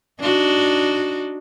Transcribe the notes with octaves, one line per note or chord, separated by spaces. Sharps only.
D4 D#4 F#4